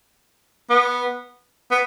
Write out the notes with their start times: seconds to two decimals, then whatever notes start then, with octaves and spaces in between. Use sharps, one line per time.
0.70 B3
1.71 B3